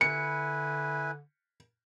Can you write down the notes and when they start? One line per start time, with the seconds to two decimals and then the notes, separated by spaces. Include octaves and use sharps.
0.01 D3 E4 B4 G#5 C#7